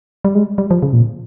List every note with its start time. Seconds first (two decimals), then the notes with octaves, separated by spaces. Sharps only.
0.25 G3
0.35 G#3
0.58 G3
0.71 F3
0.83 C#3
0.93 A#2